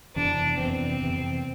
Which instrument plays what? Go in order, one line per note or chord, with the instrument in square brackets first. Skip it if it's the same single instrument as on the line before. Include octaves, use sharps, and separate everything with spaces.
[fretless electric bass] F2 C3 E3 B3 [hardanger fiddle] D4
[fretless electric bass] F2 C3 E3 B3 [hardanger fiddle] C4
[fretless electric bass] F2 C3 E3 B3